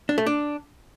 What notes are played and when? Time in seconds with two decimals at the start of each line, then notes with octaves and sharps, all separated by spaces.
0.09 D4
0.18 A3
0.26 D4